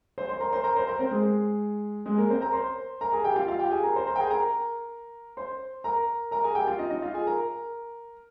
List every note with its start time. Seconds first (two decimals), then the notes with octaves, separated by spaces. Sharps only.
0.18 C5 C6
0.29 C5 C6
0.40 A#4 A#5
0.53 C5 C6
0.64 A#4 A#5
0.76 C5 C6
0.87 A#4 A#5
0.99 C4 C5
1.11 G#3 G#4
2.06 G#3 G#4
2.18 A#3 A#4
2.30 C4 C5
2.41 A#4 A#5
2.53 C5 C6
3.01 A#4 A#5
3.12 G#4 G#5
3.24 G4 G5
3.36 F4 F5
3.48 F4 F5
3.59 G4 G5
3.72 G#4 G#5
3.83 A#4 A#5
3.96 C5 C6
4.07 A#4 A#5
4.16 G5
4.20 G#4 G#5
4.30 A#4 A#5
5.37 C5 C6
5.84 A#4 A#5
6.31 A#4 A#5
6.44 G#4 G#5
6.55 G4 G5
6.67 F4 F5
6.79 D#4 D#5
6.90 D#4 D#5
7.02 F4 F5
7.14 G#4 G#5
7.27 A#4 A#5